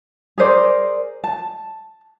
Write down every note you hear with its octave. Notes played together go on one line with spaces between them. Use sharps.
G#4 A#4 C5 D5
A5